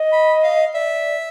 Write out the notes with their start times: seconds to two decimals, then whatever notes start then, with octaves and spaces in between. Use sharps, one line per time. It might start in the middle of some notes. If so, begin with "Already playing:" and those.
Already playing: D#5
0.13 B5
0.44 F5
0.74 D5 E5